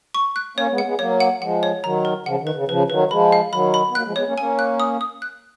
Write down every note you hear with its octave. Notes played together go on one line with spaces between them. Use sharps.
C#6
F#6
A#3 C#4 C#5
G#3 B3
F#5
G#3 B3
F#3 A#3 C#5
F#5
F3 G#3 F#5
C#5
D#3 F#3 A#5
A#4
C#3 F3 F#5
D#3
B4
C#3
C#3 F3 B4
D#3 F#3 B4
F3 G#3 B5
F5
D#3 F#3 B5
B5
B3
F#3 A#3 F#6
F3 G#3
G#3 B3 C#5
A#3 C#4
A#3 C#4 G#5
F#6
D#6
D#6
F#6